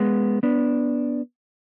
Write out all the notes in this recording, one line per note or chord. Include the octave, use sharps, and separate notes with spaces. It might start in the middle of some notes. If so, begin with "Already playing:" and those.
Already playing: G#3 B3
B3 D4